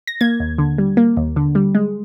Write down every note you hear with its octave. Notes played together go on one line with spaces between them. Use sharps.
A#6
A#3 G#6
D#2
D3
G3
A#3
D#2
D3
G3
G#3